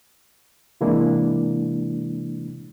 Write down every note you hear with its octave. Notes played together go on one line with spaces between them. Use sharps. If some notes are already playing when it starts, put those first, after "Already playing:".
C3 E3 G#3 A#3 D4 E4